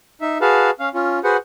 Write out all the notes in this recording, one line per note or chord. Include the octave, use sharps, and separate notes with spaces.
D#4 E5
F#4 G#4 B4 F5 A5
C#4 F5
C#4 F4
F#4 G#4 B4 C5 F#5